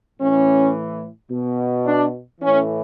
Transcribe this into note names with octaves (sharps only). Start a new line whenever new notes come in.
A2 E3 C#4
B2
D4
A2 E3 C#4